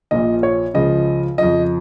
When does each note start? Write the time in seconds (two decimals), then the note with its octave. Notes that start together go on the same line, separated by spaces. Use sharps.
0.11 A#1 A#2 F3 D#5
0.43 C#5
0.74 C#2 C#3 F3 D#5
1.38 F2 C#3 F3 D#5